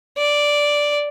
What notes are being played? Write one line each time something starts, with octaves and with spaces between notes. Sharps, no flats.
D5